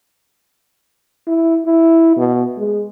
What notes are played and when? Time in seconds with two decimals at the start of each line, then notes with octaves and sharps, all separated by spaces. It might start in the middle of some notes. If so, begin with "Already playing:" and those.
1.27 E4
1.66 E4
2.17 B2
2.58 G#3